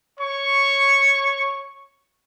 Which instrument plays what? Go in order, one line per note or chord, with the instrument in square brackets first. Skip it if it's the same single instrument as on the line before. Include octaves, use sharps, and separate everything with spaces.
[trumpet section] C#5 C#6